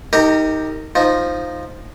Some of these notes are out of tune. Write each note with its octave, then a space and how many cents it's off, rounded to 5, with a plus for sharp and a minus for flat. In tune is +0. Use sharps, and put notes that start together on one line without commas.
D#4 +10 G4 +5 A#4 -30
F3 +0 D#4 +0